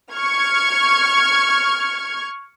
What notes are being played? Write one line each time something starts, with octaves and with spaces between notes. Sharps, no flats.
C#6 F6 G#6